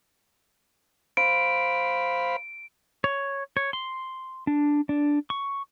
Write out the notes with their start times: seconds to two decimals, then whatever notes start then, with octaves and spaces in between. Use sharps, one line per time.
1.17 C5 F5 B5 D7
3.04 C#5
3.57 C#5
3.73 C6
4.47 D4
4.89 D4
5.30 C#6